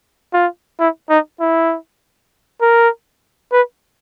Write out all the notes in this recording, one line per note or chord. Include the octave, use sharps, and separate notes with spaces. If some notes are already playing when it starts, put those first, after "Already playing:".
F4
E4
D#4
E4
A#4
B4